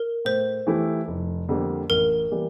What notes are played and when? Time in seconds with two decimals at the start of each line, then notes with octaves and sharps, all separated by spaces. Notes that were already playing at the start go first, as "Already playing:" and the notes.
Already playing: A#4
0.25 A2 C5
0.67 E3 A3 E4 G4
1.08 F1
1.49 F2 D3 G3 A#3
1.90 A1 A#4
2.31 E3 G3 A#3